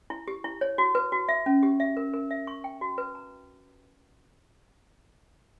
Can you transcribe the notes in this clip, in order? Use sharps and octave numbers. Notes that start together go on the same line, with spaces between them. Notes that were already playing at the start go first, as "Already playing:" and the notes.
E4
G4
E4
C#5
F#4
B4
F#4
E5
C#4
G4
E5
A#4
A#4
E5
C#6
G5
F#4
B4
A#5